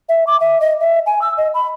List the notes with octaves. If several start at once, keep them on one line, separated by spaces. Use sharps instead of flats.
E5
D6
E5
D#5
E5
G#5
E6
D#5
B5